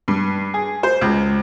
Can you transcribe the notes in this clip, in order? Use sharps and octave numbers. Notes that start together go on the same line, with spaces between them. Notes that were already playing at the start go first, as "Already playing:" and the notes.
G2
G#4
C5
C#2